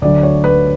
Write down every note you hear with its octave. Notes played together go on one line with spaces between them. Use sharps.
D2 D3 F#3 D5
C#5
B4